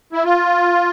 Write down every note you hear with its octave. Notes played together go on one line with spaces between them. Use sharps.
E4
F4